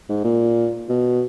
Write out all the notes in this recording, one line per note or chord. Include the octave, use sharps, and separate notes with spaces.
G#2
A#2
B2